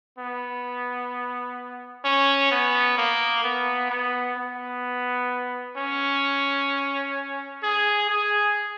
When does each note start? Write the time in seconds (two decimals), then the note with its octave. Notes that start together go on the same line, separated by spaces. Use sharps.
0.18 B3
2.05 C#4
2.51 B3
2.98 A#3
3.44 B3
3.90 B3
4.37 B3
5.77 C#4
7.63 G#4
8.10 G#4